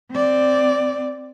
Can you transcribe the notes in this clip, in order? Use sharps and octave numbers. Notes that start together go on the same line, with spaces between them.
C4 D5